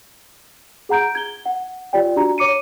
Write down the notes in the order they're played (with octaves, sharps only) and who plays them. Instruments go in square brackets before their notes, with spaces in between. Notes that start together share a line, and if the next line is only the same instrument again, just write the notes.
[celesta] G#4 F#5 A#5 G6 D7
G#6 G7
F#5
F4 G4 D5 G5
D4 F#4 G4 A#5
C#5 D6 C#7 D#7